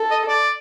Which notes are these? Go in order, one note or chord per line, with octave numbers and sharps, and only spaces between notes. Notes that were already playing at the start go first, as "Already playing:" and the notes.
Already playing: A4
D#5
D5